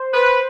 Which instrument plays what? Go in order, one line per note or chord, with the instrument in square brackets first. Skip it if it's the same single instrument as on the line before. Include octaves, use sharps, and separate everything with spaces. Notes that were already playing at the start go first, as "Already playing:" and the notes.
Already playing: [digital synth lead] C5
[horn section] B4